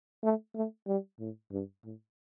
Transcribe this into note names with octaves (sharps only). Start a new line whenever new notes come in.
A3
A3
G3
A2
G2
A2